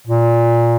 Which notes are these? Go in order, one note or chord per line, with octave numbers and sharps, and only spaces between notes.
A#2